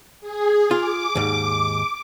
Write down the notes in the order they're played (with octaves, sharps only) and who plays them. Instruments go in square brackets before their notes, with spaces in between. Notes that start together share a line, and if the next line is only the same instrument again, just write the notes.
[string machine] G#4
[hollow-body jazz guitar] F4 [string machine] D6
[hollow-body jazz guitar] D#2 G#2